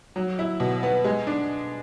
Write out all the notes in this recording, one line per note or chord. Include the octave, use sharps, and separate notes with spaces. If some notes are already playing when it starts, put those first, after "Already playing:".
F#3
E4
B2
B3
G#3
D4